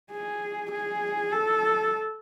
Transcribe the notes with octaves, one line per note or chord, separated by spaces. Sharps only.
G#4
G#4
A4